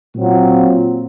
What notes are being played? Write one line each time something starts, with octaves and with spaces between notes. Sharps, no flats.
A#2 F#3 C4 F4